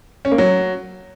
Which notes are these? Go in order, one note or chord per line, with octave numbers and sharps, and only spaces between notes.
C#4
A#3
F#3